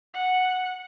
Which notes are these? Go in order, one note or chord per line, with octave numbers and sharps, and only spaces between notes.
F#5